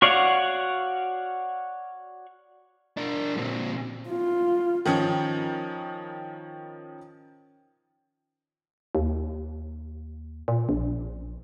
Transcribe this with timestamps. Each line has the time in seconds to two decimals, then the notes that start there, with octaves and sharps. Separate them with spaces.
0.02 F#4 C#5 D5 F5 F#5
2.97 D4 A#4
3.37 A#2 C4
4.09 F4
4.86 D#3 F3 C#4
8.95 D#2
10.48 A#2
10.69 A#1